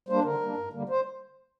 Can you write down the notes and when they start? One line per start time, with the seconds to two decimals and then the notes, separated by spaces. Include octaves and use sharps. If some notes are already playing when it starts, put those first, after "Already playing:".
0.09 G3 A#3 D4 C5
0.24 D3 A#4
0.41 G3 A#3 D4
0.57 G2
0.73 D3 G3 A#3
0.89 C5